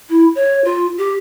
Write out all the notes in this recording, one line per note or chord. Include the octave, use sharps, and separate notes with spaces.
E4
C#5
F4
G4